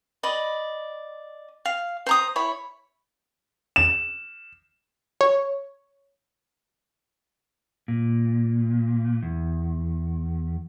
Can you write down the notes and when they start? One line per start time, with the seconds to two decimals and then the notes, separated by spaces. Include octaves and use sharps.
0.23 D5 D#5 B5
1.65 F5
2.06 C5 A#5 D#6
2.36 E4 C#5 B5
3.76 E7
5.21 C#5
7.88 A#2
9.23 E2